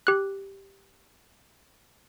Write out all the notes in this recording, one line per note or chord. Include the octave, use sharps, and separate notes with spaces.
G4 F#6